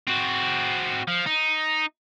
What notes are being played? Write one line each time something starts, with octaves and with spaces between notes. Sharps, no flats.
C4 F#4
F3
D#4